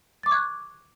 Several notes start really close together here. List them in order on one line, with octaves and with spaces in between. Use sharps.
A6 D6 C#6 G#6 F#6